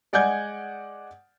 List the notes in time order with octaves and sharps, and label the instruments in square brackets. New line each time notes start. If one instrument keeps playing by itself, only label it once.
[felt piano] G#3 D5 F#5 G#5 G6 G#6